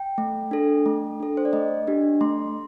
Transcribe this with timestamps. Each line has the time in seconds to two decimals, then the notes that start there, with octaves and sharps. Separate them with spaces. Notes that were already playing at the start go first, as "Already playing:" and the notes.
Already playing: G5
0.18 A3
0.51 D4 A4
0.86 A3
1.20 D4 A4
1.37 C5
1.45 D5
1.53 A3 D#5
1.87 D4 G4
2.21 A3 C6